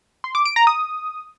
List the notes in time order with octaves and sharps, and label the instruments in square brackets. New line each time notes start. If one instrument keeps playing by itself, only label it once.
[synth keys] C6
D6
D7
A#5
D#6